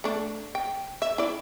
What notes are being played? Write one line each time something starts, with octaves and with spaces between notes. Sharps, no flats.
A3 D4
G5
E5
E4 D5